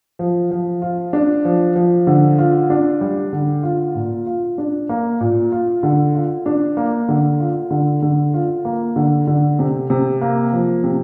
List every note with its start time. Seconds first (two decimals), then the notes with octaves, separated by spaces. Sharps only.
0.19 F3
0.51 F3
0.82 F4
1.13 D4
1.45 F3
1.76 F3
2.07 D3
2.38 F4
2.70 D4
3.01 G3
3.33 D3
3.63 F4
3.95 A#2
4.26 F4
4.58 D4
4.89 A#3
5.21 A#2
5.52 F4
5.83 D3
6.14 F4
6.46 D4
6.77 A#3
7.09 D3
7.40 F4
7.71 D3
8.02 D3
8.34 F4
8.65 A#3
8.96 D3
9.27 D3
9.59 C3
9.90 C3
10.21 A#3
10.52 F3
10.84 C3